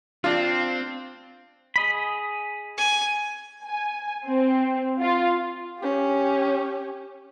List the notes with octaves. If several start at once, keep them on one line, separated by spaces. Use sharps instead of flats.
C4 D4 F4
G#4 D#5 B5
G#5
G#5
C4
F4
C#4 G4